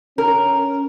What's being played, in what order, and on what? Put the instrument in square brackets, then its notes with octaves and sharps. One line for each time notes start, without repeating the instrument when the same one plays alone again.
[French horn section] C#4 [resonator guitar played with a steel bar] A#4